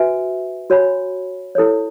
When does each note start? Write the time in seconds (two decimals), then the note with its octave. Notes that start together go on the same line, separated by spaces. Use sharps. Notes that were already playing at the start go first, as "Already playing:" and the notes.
Already playing: F#4 B4 E5 G#5
0.70 F#4 C#5 G#5 B5
1.55 E4 A4 C#5